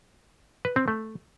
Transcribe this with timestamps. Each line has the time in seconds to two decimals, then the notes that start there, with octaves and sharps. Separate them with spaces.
0.65 B4
0.76 C4
0.88 A3